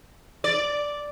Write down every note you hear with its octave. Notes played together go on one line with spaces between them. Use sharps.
D5